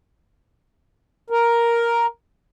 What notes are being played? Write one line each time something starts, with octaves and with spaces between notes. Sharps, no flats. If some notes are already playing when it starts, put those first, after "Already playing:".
A#4